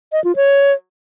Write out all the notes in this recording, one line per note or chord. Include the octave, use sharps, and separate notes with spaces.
D#5
F4
C#5